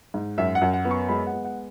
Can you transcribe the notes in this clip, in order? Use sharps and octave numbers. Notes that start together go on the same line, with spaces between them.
G#2
F#2 E5
F#5
F#2
F#5
B3
C#6
G#3 B5
F#5
B3
F#5